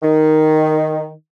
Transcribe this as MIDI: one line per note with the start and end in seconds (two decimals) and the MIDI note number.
0.03 1.09 51